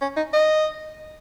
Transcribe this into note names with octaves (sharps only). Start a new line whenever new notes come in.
C#4
D#4
D#5